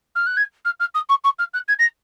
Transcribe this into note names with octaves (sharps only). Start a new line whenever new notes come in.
F6
F#6
G#6
F6
F6
D#6
C#6
C#6
F6
F#6
G#6
A#6